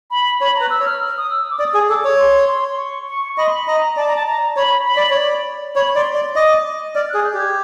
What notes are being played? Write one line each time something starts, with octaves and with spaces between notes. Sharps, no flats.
B5
C#5 B5
B4 A#5
E6
C#5
F6
D#6
E6
D6
D5 D#6
G#4
A4 D6
C#5
C6
C6
C6
C#6
C#6
D#5 B5
C6
B5
D#5 A#5
D5 A5
A#5
A5
A#5
C#5 B5
B5
D5
C#5
D5
C#5 B5
D5 C6
D5
D#5 D6
D5 F6
G#4 F#6
G6
G4
G#6